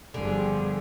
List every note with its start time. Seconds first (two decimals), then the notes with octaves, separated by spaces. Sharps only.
0.14 G1 D3 F3 G3 G#4